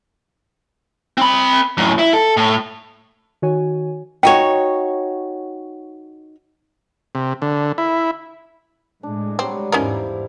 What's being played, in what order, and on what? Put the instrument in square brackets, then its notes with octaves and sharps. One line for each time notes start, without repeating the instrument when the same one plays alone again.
[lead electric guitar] C4 B5
F#2 A2
E4
A4
A2
[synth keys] D#3 F#4 C#5 G#5
[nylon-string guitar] D#4 F#4 C#5 [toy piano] G5
[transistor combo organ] C3
D3
E4
[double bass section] A2 G#3 [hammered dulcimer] D4
[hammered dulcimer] F#3 G3 [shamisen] C4
[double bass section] E2 G#2 [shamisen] C#4 D#4 A#4 [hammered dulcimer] E4 C5 F5